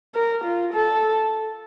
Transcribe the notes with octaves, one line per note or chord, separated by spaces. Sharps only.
A#4
F4
A4